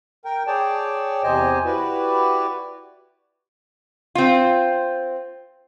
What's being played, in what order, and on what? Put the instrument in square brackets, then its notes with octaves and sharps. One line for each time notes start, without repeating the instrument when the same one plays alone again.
[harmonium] A#4 G5
G#4 C#5 D5 G5 A5
E2 C3 G4 C5 D#5 G#5
E4 F#4 G4 B4 D5
[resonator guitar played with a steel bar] C4 F4